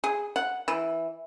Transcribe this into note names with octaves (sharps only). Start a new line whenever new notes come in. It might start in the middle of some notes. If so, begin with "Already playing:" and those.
G#4
F#5
E3